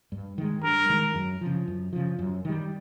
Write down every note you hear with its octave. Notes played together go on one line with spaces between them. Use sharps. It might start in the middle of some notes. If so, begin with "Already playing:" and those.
G2
D#3 G#3
G2 A#4
D#3 G#3
F#2
C#3 F3
F#2
C#3 F3
F#2
D#3 G3